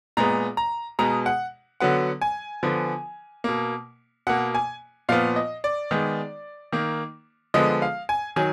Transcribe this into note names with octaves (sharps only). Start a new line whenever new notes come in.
A#2 G#3 B3 A#5
A#5
B2 G#3 B3 A#5
F#5
D3 F#3 B3 F#5
G#5
D3 F3 B3
B2 A#3
B2 A#3 F#5
G#5
A#2 F3 B3 F5
D#5
D5
D#3 G#3 B3
D#3 A#3
D3 F3 G#3 B3 D#5
F5
G#5
D#3 F#3 G#5